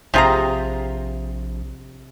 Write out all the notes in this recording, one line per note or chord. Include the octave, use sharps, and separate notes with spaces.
A#1 C3 F4 G4 G#4 A#5